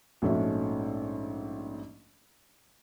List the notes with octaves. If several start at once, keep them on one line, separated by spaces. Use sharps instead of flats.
A#1 G#2 A3 C#4 F#4 E5